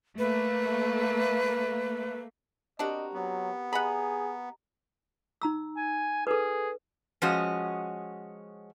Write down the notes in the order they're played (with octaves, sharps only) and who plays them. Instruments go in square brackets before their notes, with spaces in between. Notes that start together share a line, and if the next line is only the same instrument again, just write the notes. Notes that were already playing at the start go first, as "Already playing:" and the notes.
[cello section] A3 A#3 [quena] B4
[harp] C4 G4 A#4 [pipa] D4 F#4 [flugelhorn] D#5
[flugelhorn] F#3 [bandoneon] B3
[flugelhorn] G#4 [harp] D#5 A#5 [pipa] F#5 B5
[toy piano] D#4 A#5 E6
[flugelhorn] G#5
[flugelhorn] G#4 [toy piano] A4 B4
[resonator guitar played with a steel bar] F3 G#3 C#4 F#4 D#5